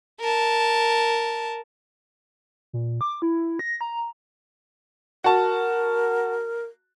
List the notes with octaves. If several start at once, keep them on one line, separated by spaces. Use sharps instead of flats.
A#4 A5
A#2
D6
E4
A#6
A#5
F#4 A#4 A5